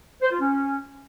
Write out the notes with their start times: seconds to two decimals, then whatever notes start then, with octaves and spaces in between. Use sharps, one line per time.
0.22 C5
0.31 F4
0.39 C#4